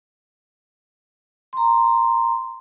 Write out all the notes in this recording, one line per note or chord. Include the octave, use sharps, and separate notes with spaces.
A#5 C6